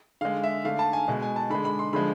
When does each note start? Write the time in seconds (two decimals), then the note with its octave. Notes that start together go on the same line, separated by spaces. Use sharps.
0.21 D3 G#3 F5
0.43 E5
0.65 D3 A3 F5
0.79 A5
0.93 G#5
1.08 B2 G#3
1.22 G#5
1.36 A5
1.50 D3 G#3 B5
1.65 B5
1.79 C6
1.93 D3 F3 G#3 B5